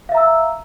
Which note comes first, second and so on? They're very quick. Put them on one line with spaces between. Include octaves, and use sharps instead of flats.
F5 E5 A#5 E6